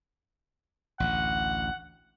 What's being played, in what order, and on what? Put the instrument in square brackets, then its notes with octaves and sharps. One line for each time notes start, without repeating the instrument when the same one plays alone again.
[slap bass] A1 D2 [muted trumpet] F#5